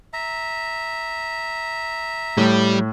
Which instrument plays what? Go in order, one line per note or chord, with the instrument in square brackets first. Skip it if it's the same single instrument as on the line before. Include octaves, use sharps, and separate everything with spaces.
[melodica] E5 A#5
[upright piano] A2 [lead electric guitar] G3